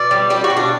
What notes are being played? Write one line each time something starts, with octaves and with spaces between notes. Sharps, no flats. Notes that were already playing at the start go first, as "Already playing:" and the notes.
Already playing: B2 D5
G3
G3 G4
F#4
B2
D4